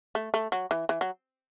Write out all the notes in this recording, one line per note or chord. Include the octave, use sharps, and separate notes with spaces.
A3
A3
F#3
E3
E3
F#3